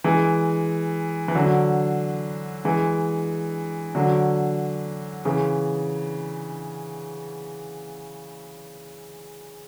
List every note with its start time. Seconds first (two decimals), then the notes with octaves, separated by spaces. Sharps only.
0.04 E3 G#3
1.28 E3
1.35 D3 F#3
2.65 E3 G#3
3.95 D3 F#3
5.25 C#3 E3